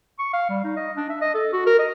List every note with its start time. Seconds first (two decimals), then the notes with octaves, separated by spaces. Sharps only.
0.19 C#6
0.33 F5
0.50 G3
0.64 D#4
0.77 D#5
0.97 D4
1.10 E5
1.22 D#5
1.34 A4
1.53 F#4
1.66 A#4
1.79 D#5